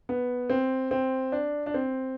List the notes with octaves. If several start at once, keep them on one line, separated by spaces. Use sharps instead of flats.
B3
C4
C4
D4
D4
C4